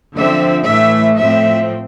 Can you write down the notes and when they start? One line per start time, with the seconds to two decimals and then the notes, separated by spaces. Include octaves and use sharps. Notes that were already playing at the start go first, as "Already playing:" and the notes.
0.14 D3 F3 C4 E5
0.66 A2 E3 A3 E5
1.18 A2 F3 A3 C4 E5